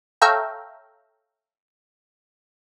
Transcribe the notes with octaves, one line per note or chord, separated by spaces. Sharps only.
A4 C#5 E5 F5 G5 A#5